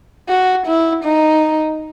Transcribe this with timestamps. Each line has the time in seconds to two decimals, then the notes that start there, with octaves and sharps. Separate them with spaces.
0.29 F#4
0.66 E4
1.04 D#4